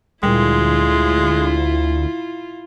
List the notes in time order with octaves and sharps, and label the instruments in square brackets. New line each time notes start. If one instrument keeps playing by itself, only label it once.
[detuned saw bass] D2 [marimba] A#2 G3 [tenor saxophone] G#3 [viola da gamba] E4 F4